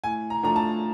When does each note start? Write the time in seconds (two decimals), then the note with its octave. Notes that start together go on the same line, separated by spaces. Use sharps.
0.04 A2 G#5
0.30 A#5
0.43 F3 A3 D4 A#5
0.56 A5